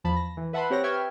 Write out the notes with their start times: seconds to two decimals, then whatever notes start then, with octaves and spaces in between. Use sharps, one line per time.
0.04 E2 F3 A5 B5
0.16 A#6
0.37 E3
0.53 B4 E5 F#5 A5 B5 C6
0.70 C4 G4 C#5 F#5 A#6
0.83 B4 E5 G5 C#6 F6 G#6